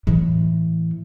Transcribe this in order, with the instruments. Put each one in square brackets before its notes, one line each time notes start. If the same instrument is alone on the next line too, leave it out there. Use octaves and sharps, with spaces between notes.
[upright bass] A2 E3